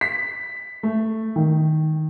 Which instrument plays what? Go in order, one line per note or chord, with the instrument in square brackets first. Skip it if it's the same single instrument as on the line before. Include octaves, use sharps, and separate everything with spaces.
[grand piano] B6
A3
D#3